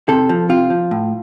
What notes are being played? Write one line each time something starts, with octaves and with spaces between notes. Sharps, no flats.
C3 A4
F3
C3 F4
F3
A2